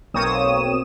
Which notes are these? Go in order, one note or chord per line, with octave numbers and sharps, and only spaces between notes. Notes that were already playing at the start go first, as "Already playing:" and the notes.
B1 A#3 C4 C#5 D#6 E7